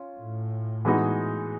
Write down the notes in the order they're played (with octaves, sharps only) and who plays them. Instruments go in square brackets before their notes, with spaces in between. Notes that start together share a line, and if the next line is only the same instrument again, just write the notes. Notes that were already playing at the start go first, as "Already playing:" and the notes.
Already playing: [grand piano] C#4 F4
[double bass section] A2
[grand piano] E3 G#3 B3 D#4 F#4